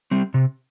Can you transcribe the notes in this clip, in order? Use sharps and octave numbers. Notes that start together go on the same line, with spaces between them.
G3 C4
C3